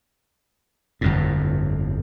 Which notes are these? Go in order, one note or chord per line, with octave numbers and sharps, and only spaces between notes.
G1 F2 A2